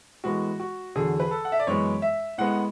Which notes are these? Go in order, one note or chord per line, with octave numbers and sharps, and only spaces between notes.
A2 E3 G#3 B3 F#4
F#4
E2 D3 F#3 G#4
B4
A4
F#5
E5
D5
F#2 E3 G#3 B3 C#5
E5
A2 G#3 B3 F#5